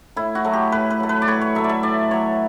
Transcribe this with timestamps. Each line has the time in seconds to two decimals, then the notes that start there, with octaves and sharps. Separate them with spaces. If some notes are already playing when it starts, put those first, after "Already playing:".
0.16 A2 E4
0.35 F#4
0.45 F#3 A3
0.53 G4
0.72 A2 B4
0.90 B4
1.00 F#3 A3
1.09 B4
1.22 D5
1.28 A2 C#5
1.41 C#5
1.55 F#3 A3 E5
1.64 D5
1.69 E5
1.83 A2 D5
2.11 F#3 A3 C#5